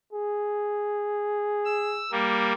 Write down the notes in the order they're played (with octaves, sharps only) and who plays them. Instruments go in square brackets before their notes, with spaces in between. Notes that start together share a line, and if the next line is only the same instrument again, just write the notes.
[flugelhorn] G#4
[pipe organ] E6
G3 A#3